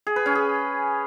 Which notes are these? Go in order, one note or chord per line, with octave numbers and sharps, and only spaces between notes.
G#4
B4
C#4
G#4